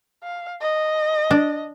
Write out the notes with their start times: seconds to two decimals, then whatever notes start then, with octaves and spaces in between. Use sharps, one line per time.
0.23 F5
0.61 D#5
1.31 D4